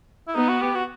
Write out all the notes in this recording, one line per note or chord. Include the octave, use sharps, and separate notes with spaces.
E4
B3 D#4
F#4
G4
F#4